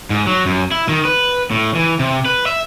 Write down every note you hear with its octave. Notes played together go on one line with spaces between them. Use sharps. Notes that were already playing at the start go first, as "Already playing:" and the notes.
G#2
F#3
F#2
E4
D#3
B4
A2
E3
C3
B4
E5